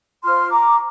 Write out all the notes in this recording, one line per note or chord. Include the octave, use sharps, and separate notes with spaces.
F4 C5 C6 F6
A#5 D6